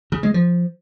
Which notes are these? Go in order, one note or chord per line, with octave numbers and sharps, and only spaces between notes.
C#3
G#3
F3